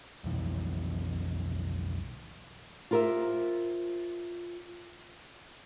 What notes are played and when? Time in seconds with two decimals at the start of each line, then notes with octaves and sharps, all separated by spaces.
0.24 B1 F2 E3
2.91 F4 G4 A#4 C5 E5